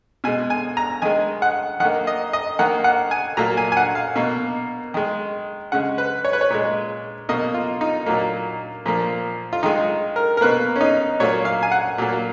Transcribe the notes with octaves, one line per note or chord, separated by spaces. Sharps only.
B2 G#3 G#5
G#5
A#5
D#3 G#3 G#5
F#5
D#3 F#5
A#3
D#5
D#5
D#3 A#3 F#5
F#5
G#5
A#2 F#3 A#3 A#5
G#5
G#5
F#5
F5
B2 A#3
D#3 G#3
C#3 G#3 F#5
B4
C#5
B4
C#5
A#2 G#3
B2 A#3 D#5
F4
D#4
A#2 F#3 A#3
A#2 F3 A#3
F4
D#3 G#3 D#4
A#4
A#4
B2 A#3 B4
C#4
D#4
A#2 F#3 A#3 C#5
F5
G#5
F#5
A#2 F#3 A#3